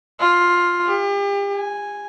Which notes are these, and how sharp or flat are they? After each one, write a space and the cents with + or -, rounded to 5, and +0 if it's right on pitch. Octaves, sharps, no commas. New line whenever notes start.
F4 +10
G4 +40
G#5 -5